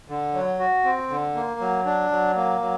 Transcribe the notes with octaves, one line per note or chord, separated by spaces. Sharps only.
D3
F#3
F#4
C4
D3
A#3
F#3
D4
F#3
A#3
F#3